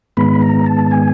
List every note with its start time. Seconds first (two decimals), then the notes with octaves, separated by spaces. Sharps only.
0.17 G#2 D#3 G#3 B3 B5
0.42 A#5
0.66 A5
0.91 G#5